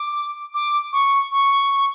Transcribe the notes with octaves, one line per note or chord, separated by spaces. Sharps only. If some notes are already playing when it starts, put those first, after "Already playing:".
Already playing: D6
D6
C#6
C#6